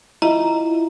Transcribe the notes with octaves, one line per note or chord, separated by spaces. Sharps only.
E4 F4 D#5 A#5